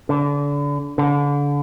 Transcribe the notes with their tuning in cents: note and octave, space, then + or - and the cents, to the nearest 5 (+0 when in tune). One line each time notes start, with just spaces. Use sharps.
D3 -30
D3 -30